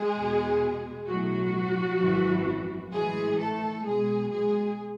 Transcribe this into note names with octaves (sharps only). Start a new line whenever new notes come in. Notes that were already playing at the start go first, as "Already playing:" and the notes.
Already playing: G#3 G#4
E2 B2
B1 A2 E3 F#3 F#4
G#1 F#2 E3
A1 A2 E3 G#3 G#4
A3 A4
B1 B2 G#3 G#4
G#3 G#4